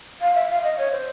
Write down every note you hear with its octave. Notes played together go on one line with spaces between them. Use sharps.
F5
E5
F5
D#5
C#5
C5